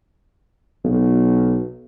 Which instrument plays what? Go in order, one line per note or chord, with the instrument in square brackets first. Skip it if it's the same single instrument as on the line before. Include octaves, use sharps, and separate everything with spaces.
[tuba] B1